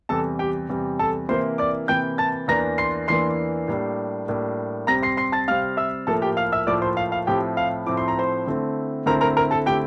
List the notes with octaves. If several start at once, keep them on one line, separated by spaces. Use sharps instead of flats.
E2 C3 G3 A4 A5
G4 G5
E2 C3 G3
A4 A5
C3 E3 A#3 E4 C5 C6
D5 D6
C3 E3 A#3 E4 G5 G6
A5 A6
E2 E3 A#3 D4 A#5 A#6
C6 C7
E2 E3 A#3 D4 C6 C7
A2 G3 A#3 D4
A2 G3 A#3 D4
C3 G3 C4 A#5 A#6
C6 C7
C6 C7
A5 A6
C3 G3 C4 F5 F6
E5 E6
A2 F3 A#3 E4 A4 A5
G4 G5
F5 F6
E5 E6
A2 F3 A#3 E4 D5 D6
C5 C6
F5
F5
A2 F3 C4 E4 G4 G5
F5
A2 F3 C4 E4 D6
C6
A#5
C5 C6
D3 A3 C4 E4
D3 A3 C4 E4 A#4 A#5
A#4 A#5
A#4 A#5
A4 A5
D3 A3 C4 E4 G4 G5